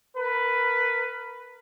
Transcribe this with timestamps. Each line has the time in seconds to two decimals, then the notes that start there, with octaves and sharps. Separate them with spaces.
0.17 A#4 B4